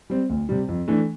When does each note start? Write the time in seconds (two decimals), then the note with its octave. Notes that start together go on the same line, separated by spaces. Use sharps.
0.10 G3 C4
0.30 D2
0.49 C3 G3
0.68 F2
0.88 E3 A3 D4